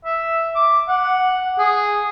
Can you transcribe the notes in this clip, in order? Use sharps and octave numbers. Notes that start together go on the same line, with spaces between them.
E5
D6
F#5
G#4